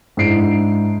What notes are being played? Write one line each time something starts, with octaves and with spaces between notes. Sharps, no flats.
G#2 D4 E4 C7 D7